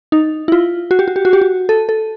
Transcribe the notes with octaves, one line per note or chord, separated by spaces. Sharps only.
D#4
E4
F4
F#4
G4
F#4
G4
F#4
G4
F#4
A4
A4